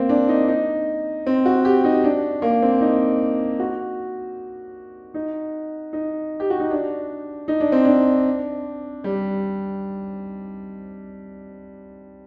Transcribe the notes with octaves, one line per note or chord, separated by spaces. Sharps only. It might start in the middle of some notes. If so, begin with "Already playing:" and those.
Already playing: A#3 C4
D4
D#4
D#4
C4
F#4
G4
D#4
D4
A#3
C4
D#4
F#4
D#4
D#4
G4
F#4
D#4
D4
D#4
D4
C4
D4
G3